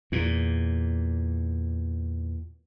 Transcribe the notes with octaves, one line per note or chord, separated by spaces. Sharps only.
E2 A#2